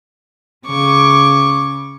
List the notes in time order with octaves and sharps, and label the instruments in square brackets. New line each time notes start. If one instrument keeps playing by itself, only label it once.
[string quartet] C#3 [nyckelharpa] C#6 D6